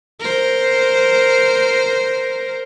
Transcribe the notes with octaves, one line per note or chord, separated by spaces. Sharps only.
A#4 C5